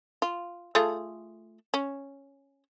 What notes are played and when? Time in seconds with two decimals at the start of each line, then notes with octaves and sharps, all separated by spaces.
0.22 F4
0.75 A3 F4 G#4
1.74 C#4